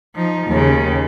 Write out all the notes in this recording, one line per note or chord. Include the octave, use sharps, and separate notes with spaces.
F3 D#4
D#2 C#3